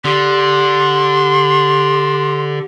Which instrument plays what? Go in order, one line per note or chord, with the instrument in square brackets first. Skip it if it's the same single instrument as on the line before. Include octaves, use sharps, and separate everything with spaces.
[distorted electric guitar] D3 [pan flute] G4 [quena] C6